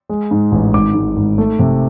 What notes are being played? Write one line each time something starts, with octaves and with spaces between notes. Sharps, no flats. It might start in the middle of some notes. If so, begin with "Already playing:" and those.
G#3
G#2
A1
G#1 D6
G#2
G#1
A3
C3